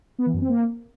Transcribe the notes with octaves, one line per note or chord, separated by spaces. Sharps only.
B3
E3
F#2
C4
A#3